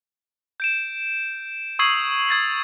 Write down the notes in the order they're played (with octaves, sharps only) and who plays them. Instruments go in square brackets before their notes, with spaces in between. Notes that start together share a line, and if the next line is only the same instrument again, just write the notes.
[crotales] G6 D7 E7
C#6 D#6 E6 G#6 C7 F#7
D#6 G#6 A6 C7